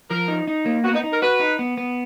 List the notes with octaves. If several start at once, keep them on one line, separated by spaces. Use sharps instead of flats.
F3 A#4
D#4
D#4
A#3
B3 F#4
D#4
D#4
A#4
F#4 B4
D#4
B3
B3